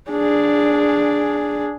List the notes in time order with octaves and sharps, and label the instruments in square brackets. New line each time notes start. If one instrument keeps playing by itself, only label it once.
[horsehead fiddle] D4 G#4